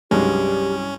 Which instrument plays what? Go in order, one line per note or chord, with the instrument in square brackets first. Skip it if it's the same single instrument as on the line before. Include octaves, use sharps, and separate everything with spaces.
[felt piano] C2 F#3 [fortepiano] G2 G#3 [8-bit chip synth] C#4 [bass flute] G4